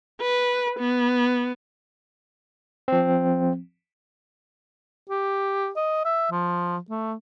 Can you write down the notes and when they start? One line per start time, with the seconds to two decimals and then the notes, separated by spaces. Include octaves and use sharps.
0.22 B4
0.80 B3
2.88 F3 C4
5.09 G4
5.77 D#5
6.05 E5
6.31 F3
6.90 A3